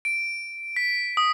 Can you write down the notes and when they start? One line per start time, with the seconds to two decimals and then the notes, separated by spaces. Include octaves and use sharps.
0.05 D7
0.76 B6
1.17 D#6